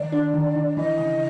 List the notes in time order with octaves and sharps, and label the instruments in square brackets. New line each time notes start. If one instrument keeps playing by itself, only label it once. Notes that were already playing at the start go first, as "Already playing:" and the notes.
Already playing: [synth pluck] D#3 [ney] D5
[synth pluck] D4
D#3
D#3
[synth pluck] E3 [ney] D#5
[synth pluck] C#3